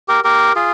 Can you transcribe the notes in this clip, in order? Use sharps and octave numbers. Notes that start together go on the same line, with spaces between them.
G4 A#4
G4 A#4
F4 G#4